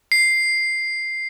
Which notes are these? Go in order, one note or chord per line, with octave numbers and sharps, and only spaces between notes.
C7